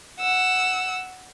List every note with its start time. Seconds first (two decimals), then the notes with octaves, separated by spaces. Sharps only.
0.20 F#5 E6